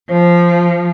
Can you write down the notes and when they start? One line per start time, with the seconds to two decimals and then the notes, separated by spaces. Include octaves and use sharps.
0.10 F3 C5